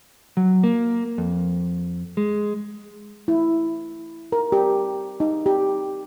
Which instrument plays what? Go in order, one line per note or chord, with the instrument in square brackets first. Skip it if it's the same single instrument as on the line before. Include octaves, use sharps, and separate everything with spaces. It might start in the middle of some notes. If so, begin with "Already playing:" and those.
[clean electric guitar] F#3
A#3
F2
G#3
[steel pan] E4
A#4
G4
D#4
G4